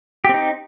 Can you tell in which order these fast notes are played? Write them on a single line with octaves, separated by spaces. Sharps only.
G4 C4 D#4